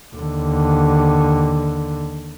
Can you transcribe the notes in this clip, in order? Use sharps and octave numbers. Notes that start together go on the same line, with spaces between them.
D#2 D3